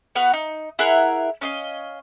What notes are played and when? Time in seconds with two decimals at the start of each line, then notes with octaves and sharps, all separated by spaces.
0.15 B3 F#4 F5
0.33 D#4
0.79 E4 G#4 A#4 F#5
1.41 C#4 D#5 F5